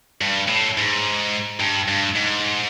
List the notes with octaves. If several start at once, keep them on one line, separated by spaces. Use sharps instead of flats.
G2
A2
G#2
G2
G2
G#2